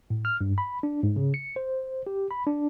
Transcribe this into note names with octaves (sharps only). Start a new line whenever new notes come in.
A2
F6
G2
B5
D4
G#2
C#3
C#7
C5
G4
B5
D4